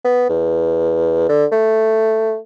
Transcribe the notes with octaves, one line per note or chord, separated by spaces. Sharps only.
B3
E2
D3
A3